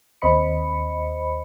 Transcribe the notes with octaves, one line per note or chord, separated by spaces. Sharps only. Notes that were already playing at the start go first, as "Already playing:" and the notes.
D#2 C4 C5 D#5 B5 C#7